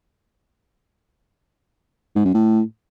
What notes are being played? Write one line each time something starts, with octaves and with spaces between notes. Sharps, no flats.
G#2
F#2
A2